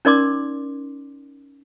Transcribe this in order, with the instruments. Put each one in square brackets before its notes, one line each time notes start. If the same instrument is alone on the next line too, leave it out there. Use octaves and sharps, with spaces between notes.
[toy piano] C#4 D#4 A#4 D5 C6 D6